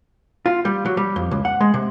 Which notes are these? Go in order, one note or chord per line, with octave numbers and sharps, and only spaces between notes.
F4
G3
F#3
G3
F2
C#2
F#5
G#3
C3